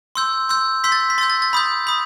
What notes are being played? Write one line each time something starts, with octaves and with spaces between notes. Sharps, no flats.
C6 E6 G6
C6 E6 G6
C6 E6 G6 B6
A6
B6
C6 E6 G6 A6
A6
A6
B5 D#6 G6
B5 D#6